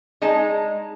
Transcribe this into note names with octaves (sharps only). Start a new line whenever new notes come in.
G#3 D#4 D#5 A5